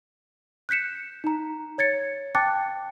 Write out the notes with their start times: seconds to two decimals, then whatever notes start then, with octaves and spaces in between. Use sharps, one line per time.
0.69 F#6 G6 B6 C#7 E7
1.24 D#4 A#5
1.78 C#5 G#6 A6 C#7
2.35 G5 A5 D6 F#6 A6 C#7